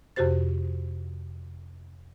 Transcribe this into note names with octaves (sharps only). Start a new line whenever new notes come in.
F2 C3 F#4 G4 C5 A6